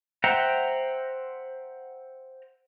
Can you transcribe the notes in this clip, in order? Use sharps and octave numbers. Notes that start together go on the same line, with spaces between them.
C5 E5 F#5 G5 A#5